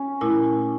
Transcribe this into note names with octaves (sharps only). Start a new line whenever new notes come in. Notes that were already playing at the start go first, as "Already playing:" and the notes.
Already playing: C#4
A#2 A3 E4 A#4